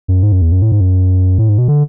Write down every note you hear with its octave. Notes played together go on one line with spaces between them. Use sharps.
F#2
G#2
F#2
E2
F#2
A2
G#2
F#2
A2
G#2
B2
D3